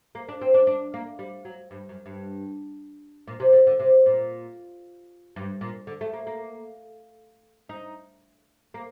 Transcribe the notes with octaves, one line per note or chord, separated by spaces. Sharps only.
A#3
D4
C4
D4
D4
A#3
G3
F#3
G2
F#2
G2
A#2
C3
D3
D3
C3
A#2
G2
A#2
D3
A3
A#3
A#3
D#4
A#3